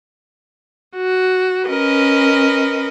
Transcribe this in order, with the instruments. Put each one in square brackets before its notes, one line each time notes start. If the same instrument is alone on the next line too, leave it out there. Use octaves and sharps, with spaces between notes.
[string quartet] F#4
C#4 A#4 B4 D#5